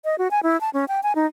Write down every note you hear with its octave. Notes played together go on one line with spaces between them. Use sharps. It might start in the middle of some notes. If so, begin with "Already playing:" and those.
D#5
F#4
G#5
E4
A5
C#4
G5
G#5
D#4